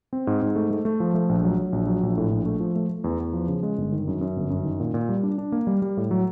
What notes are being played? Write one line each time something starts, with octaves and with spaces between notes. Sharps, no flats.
C4
G#2
G#2
A3
A3
A3
F3
A3
A#1
F#3
F#3
A#1
F#3
A#1
A2
A#1
A3
F3
A3
A3
E2
E2
F3
C#3
G#3
G1
D#3
F#2
F#2
G1
F#2
D#3
A#2
A#2
G3
D4
D4
A#3
G3
G3
A2
F#3